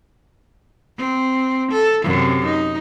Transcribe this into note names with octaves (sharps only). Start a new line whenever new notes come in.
C4
A4
F#2 C3
D#4